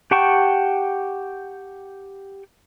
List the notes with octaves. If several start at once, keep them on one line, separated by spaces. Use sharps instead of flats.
G4 F#5 G5 A5 C#6